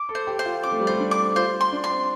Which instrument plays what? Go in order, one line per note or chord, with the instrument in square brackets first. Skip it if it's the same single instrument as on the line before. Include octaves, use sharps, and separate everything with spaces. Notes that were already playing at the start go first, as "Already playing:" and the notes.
Already playing: [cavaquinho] D6
[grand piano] A4
[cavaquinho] C5
[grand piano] G4
[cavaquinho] C5
[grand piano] F4
[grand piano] C4 [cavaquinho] D6
[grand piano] A3
G3
[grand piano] A3 [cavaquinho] C5
[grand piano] D4
[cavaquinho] D6
[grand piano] F4 [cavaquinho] C5
[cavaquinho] C6
[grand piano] D4
[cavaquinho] C6
[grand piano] C4